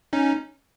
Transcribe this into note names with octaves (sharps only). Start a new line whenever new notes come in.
C#4 D#4